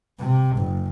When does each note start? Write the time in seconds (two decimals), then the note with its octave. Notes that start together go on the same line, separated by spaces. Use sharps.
0.19 C3
0.58 F#1